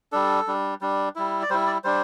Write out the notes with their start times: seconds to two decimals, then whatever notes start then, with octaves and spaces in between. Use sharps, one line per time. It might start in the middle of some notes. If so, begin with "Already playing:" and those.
0.12 G3 D4 A4
0.47 G3 D4
0.81 G3 D4
1.16 G3 E4
1.42 D5
1.50 G3 E4 C5
1.67 D5
1.84 G3 D4 C5